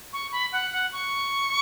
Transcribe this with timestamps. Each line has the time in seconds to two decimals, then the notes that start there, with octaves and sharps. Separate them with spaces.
0.13 C#6
0.32 B5
0.52 F#5
0.73 F#5
0.92 C#6